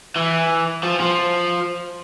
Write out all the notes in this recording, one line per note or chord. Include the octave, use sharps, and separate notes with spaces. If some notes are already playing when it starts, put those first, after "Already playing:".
E3
F3
F3